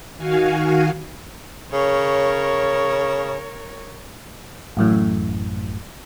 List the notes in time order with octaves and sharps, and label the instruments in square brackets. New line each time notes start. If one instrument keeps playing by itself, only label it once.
[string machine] D#3 F#4 F5 G#5
[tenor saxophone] C#3 [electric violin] A#4 C#5
[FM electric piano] A1 F#2 A2